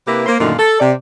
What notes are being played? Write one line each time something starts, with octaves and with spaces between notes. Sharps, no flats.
C3 A#3 E4 G4 B4
A#3 C5
F#2 A#2 D3 D#3 A3 F4
A4
C3 D5